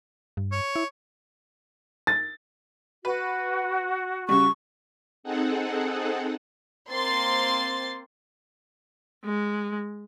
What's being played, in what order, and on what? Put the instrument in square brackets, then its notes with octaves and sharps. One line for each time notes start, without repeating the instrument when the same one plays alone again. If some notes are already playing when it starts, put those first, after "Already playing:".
[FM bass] G2
[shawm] C#5
[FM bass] E4
[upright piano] A6
[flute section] F#4 [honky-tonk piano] B4
[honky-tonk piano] C#3 G3 [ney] C#6
[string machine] C4 D#4 G#4 A4 F#5
[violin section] A#3 C4 C6 A6 C7
[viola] G#3